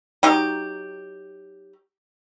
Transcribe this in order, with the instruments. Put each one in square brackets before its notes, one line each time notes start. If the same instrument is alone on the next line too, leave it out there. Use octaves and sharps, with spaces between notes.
[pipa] F#3 D#4 G4